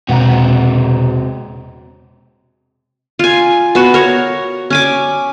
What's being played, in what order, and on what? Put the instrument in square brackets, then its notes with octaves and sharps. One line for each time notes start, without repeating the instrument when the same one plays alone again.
[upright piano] E1 F#5 A#5 [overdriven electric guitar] C3 F#4
[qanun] F4 G#5
B3 F#4
A#4 C#5
C#4 G#5 D6